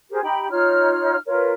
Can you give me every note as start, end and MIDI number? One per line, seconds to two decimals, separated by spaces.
0.11 0.20 67
0.11 0.20 68
0.11 0.20 70
0.11 0.20 72
0.22 0.48 63
0.22 0.48 67
0.22 0.48 79
0.22 0.48 83
0.50 1.16 63
0.50 1.16 65
0.50 1.16 73
0.50 1.16 89
1.26 1.52 65
1.26 1.52 70
1.26 1.52 71
1.26 1.52 73